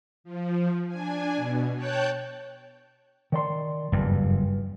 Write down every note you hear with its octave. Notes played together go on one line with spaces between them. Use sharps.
F3
D4 G#5
B2
C#5 G5 A5 F#6 G6
D#3 D5 C6
F#1 E2 G2